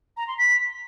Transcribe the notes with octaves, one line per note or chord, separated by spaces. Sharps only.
A#5
C6
B6